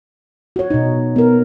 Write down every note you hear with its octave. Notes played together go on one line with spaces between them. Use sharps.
F#4 C#5
B2 D#4
B3 A#4